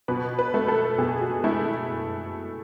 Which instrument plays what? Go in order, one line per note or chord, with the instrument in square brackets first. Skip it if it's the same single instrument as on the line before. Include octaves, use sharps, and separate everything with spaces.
[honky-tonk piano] B2 B4
B4
A3
A4
B2 G#4
F#4
A3 E4